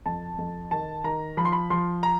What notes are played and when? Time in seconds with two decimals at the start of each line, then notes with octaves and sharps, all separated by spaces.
0.06 F2 A5
0.38 F2
0.71 D#3 A5
1.04 D#3 A#5
1.37 F3 B5
1.45 C6
1.52 B5
1.70 F3 C6
2.03 A#5